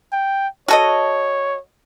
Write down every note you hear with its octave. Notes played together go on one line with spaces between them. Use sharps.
G5
F#4 A4 C#5 D#5